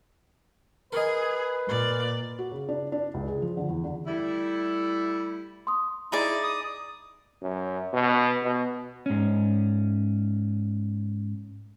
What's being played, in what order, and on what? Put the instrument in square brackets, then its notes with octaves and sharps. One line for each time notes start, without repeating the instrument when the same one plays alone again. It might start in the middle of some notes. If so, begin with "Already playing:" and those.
[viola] G#4 [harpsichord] A#4 D#5 [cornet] B4
[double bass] A#2 [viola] D5
[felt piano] F#4
C#3
D4
D4
C#2
G#4
F3
D3
E2
D3
[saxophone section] G3 A3 E4
[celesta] C6 D#6
[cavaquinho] D#4 G#4 D5 [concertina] E4
[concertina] D#6
[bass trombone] F#2
B2
B2
[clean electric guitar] G#2 C#4